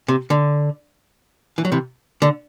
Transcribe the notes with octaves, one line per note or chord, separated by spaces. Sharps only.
C3
D3
E3
F#3
C3 E3
D3